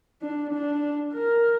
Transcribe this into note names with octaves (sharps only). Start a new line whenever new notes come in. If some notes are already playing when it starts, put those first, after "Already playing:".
D4
D4
A#4